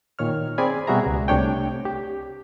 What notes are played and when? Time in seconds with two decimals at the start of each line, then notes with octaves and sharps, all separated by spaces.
0.19 A#2 D#3 C#5 F6
0.58 C4 G#4 D5 G#5 B5
0.87 B2 G3 F#4 G#4 E5 A#5
1.06 C#2
1.28 C2 C3 A3 D4 C#5 G5
1.85 G4